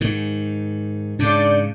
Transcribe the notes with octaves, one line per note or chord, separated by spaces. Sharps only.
G#2 D#3
G#2 C#3 D4 D5 G6